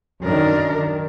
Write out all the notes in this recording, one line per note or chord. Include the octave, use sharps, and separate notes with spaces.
F#2 D#3 D4 A#4
D#3